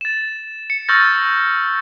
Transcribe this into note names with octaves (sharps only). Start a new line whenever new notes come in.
A6 E7
C#7
C#6 E6 F6 G6 A6 A#6